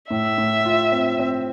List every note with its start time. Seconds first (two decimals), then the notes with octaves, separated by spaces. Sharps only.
0.11 A2 E5
0.38 A2
0.65 F4
0.92 C4
1.19 C4